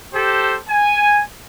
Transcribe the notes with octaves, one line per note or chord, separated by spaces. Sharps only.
G4 A4 C5
G#5